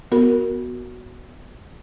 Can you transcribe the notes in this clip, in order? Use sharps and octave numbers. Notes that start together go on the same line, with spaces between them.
B3 F#4 A#4